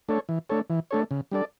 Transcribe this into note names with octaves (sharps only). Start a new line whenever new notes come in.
A3 D4 A4 C#5
E3
A3 D4 A4 C#5
E3
A3 D4 A4 C#5
C#3
G3 D4 A4 D5